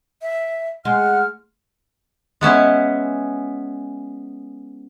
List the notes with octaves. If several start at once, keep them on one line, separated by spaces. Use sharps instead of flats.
E5
G#3 F#5 F6
G#3 B3 C#4 E4